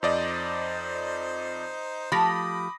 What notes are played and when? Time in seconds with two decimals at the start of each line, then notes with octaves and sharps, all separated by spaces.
0.03 F2 D#4 C5 D5 D#5
2.12 F3 A3 G4 B5 D6 D#6 A#6